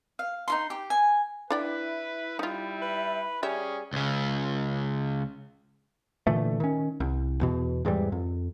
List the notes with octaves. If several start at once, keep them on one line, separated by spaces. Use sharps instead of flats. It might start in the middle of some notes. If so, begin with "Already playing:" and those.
F5
D#4 F4 C6
G4
G#5
D4 E4 B4 D5 G5
G3 D#4 F4
B4
G3 C#4 G4 G#4 E5
C#2 C#3
A#2 D3 E3 A3
D#3 C#4
C2
E2 B2
E2 G#2 E3 G3
F2